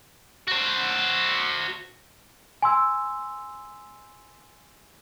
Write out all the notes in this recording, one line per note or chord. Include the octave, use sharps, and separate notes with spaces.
F#4 C5
G#5 C6 E6